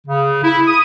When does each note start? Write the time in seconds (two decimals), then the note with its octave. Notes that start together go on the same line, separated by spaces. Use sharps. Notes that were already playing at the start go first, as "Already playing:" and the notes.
0.07 C#3
0.44 E4
0.67 D#6